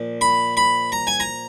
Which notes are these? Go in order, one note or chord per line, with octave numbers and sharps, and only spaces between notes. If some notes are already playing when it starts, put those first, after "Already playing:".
Already playing: A#2 F3
B5
B5
A#5
G#5
A#5